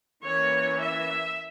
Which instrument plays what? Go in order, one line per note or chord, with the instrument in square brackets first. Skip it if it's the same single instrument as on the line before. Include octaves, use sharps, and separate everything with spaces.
[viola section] E3 A#3 C#4 C#5
E5